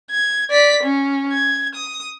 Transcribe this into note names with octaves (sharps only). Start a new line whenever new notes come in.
G#6
D5 B6
C#4
G#6
D#6